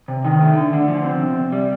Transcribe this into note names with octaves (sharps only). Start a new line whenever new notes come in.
C3
D#3
A3
D3
D3
F3
C4
C3
C3
G3